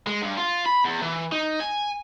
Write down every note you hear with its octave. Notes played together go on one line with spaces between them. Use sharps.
G#3
G2
F4
B5
E2
E3
D#4
G#5